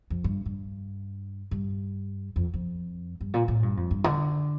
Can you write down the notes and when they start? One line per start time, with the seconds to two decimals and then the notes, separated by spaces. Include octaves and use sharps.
0.10 F2
0.24 G2
0.46 G2
1.51 G2
2.36 F2
2.54 F2
3.21 G2
3.34 A#2
3.48 A2
3.63 G2
3.77 F2
3.91 G2
4.04 D3